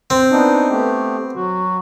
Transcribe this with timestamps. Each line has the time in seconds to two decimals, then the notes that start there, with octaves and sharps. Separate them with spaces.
0.10 C4
0.31 B3 D4 D#4
0.70 A3 B3 G4
1.35 F#3 F#4